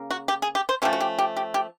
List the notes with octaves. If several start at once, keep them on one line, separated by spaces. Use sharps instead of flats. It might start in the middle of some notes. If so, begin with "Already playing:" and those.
Already playing: C#3 A#3
F#4
G4
G#4
G4
C5
F3 A3 C#4 G4
F#4
G4
G4
G4
G4